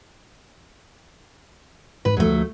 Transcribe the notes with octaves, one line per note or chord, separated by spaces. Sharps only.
G#2 B4
D2 F3 F#3 A3